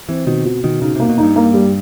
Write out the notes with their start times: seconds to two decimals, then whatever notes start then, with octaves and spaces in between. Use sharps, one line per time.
0.09 E3 C4
0.27 B2 D#3
0.45 B2
0.64 B2 D#3
0.81 C#3 D#4
0.95 C3 A#3
1.09 B2
1.18 G2 D#4
1.36 A#3
1.54 G3